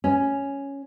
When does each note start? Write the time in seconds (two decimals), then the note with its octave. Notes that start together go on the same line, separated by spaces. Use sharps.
0.04 C#4